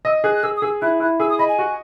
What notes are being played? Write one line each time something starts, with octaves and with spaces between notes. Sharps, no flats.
D#5 E6
G#4 F#6
F#6
G#4 E6
D#6
G#4 E6
E4 F#6
E4 F#6
G#4 E6
D#6
D#5 B5
G#5
F#4